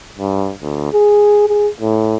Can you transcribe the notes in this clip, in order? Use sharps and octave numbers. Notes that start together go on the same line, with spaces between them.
G2
D2
G#4
G#4
A2